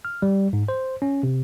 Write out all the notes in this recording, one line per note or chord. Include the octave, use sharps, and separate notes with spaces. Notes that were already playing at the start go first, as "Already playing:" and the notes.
F6
G3
G#2
C5
C#4
C3